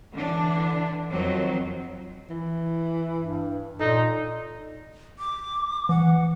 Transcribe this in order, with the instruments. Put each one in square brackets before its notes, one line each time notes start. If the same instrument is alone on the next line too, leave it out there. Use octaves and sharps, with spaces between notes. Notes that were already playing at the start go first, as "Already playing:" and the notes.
[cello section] D3 E3 D4
F2 D#3 F3 F#3 C4
[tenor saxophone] E3
[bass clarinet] G2
[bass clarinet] A#2 [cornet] D#4 [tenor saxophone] A4
[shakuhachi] D6
[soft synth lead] E3 [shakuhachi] F#5